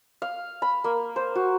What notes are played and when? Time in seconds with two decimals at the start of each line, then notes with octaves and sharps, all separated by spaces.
0.22 F5
0.62 B5
0.84 A#3
1.16 C5
1.35 F#4